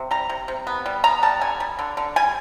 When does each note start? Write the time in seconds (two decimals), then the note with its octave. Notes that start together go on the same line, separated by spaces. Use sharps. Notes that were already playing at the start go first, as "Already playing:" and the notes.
Already playing: C3
0.11 G3 A#5
0.29 C3
0.48 C3
0.67 B3
0.86 G3
1.04 B3 A#5
1.23 G3 A5
1.41 D3 G#5
1.60 G3
1.79 D3
1.97 D3
2.16 G3 G#5